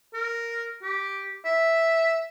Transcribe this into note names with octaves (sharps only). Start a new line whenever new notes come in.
A#4
G4
E5